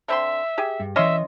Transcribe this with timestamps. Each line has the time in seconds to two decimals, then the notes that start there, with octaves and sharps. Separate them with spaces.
0.08 D3 C4 E5 C6
0.58 G4 G#4
0.80 G2
0.96 E3 C#4 D#5 E5 C6